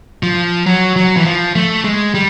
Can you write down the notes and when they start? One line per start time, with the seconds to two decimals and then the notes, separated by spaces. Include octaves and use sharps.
0.23 F3
0.66 F#3
0.96 F#3
1.17 E3
1.25 F3
1.55 A3
1.84 G#3
2.14 G3